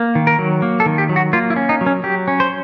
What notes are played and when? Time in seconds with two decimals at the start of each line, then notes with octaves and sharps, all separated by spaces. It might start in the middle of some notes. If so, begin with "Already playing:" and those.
Already playing: A#3
0.15 D#3
0.27 A#4
0.39 F#3
0.62 A#3
0.80 A4
0.86 D#3
0.98 G4
1.09 F#3
1.16 F#4
1.33 A#3 F4
1.50 E4
1.56 C#4
1.69 D#4
1.81 F#3
1.86 C#4
2.04 F#3 G4
2.28 C#4
2.40 C5